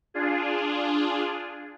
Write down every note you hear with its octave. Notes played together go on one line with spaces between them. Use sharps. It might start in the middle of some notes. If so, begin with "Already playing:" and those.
D4 F4 G#4